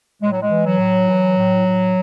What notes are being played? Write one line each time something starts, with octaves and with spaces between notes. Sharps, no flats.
A2 G#3
F#3
G#3
E3
F#3
A2
E3
A2
A2